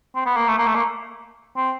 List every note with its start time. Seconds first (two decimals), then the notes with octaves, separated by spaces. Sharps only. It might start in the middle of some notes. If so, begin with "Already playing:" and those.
0.15 C4
0.26 B3
0.37 A#3
0.48 A3
0.58 A#3
0.67 A3
0.75 A#3
1.56 C4